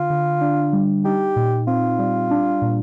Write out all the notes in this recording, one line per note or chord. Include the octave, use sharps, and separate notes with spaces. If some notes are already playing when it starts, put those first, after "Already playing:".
Already playing: D3 F4
D3
D4
G3
D#4 G4
A#2
C4 F4
G3
D4
A#2